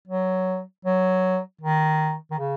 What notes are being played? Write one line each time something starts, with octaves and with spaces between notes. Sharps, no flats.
F#3
F#3
D#3
D#3
C#3